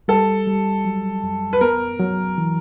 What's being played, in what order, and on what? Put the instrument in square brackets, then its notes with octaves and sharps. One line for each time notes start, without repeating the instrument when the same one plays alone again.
[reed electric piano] G3 [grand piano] A4
[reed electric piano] G3
F#3
F#2
[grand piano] B4
[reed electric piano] B3 [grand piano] A#4
[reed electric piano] F#3
E3